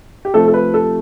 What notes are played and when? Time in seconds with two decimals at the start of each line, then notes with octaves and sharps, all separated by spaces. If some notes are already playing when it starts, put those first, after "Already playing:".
0.25 G4
0.34 C3 F3 A3 C4 A4
0.48 A4
0.54 B4
0.74 A4